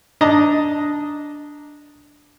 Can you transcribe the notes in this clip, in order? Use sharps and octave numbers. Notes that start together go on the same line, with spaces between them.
D4 D#5 A5 A#5